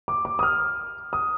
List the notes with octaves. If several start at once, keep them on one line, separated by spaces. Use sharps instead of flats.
D6
D6
D#6
F6
D#6